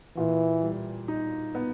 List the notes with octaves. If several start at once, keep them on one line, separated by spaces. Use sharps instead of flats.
A#2 E3
G3
D#4
B3